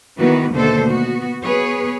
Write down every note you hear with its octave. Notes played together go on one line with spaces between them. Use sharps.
D#3 E3 A#3 B3 F#4 B4
D#2 B2 D3 A3 A4 C5
B3 F#4
B3 G#4 B4 C#5